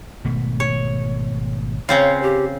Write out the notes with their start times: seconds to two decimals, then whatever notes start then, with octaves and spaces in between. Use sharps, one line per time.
0.25 G#1 B2 A3
0.60 C#5
1.89 C#3 C4 F4 C#5
2.23 G4